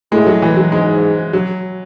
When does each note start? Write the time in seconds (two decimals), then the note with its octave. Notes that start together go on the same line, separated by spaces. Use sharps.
0.12 A2 G#3
0.26 F#3
0.42 E3
0.57 F#3
0.72 G#2 G#3
1.33 F#3